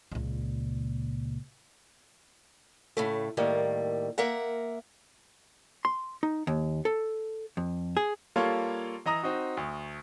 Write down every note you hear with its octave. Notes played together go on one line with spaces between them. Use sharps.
C#2 A#2
A2 C#3 A3
A2 D#3 G3 A#3
A#3 A#4 E5 F#5
C6
D#4
D#2
A4
F2
G#4
G3 A#3 F4 A4 C#5
E3 D#5 A#5 D#6 A#6
C4 D#4 F#4
D2